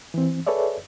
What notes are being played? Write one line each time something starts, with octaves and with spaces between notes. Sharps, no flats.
E3 C4
G#4 A4 B4 C#5 D5 E5